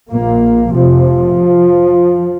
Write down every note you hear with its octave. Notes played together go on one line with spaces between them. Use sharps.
A#1 A#2 A#3
F1 F2 C3 F3